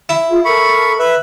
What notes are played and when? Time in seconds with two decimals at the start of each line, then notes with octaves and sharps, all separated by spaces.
0.09 E4
0.30 F4 G#4
0.45 A4 A#4 B5 C#6
0.99 B4 E5